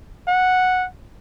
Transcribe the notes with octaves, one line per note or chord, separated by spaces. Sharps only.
F#5